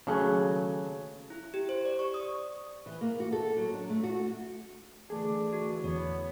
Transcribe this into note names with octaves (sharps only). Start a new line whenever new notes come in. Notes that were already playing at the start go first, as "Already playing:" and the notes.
D#2 C#3 F#3 A3 G#4 A4
E4
G4
C5
D5
C#6
D#6
E3
A#3
F#4
A4
F#3
D4
A3
F#4
D3 E3 A3 D4 G#4
F#4
E2 B3 C#5